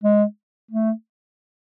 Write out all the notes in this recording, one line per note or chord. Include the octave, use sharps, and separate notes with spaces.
G#3
A3